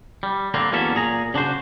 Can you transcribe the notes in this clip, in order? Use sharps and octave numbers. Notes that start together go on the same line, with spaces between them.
G3
D3 A#3 C4 D4
E2 F#3 A#3 C#4 A4 E5
A#2 G#4 A#5
C#3 D4 F#4 C5